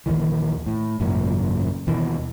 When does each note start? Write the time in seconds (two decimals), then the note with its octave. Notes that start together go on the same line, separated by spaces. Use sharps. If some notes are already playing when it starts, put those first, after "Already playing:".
0.06 A#1 D#2 D#3 E3
0.66 A2
1.00 G#1 F#2 A#2 C#3
1.87 D#2 B2 E3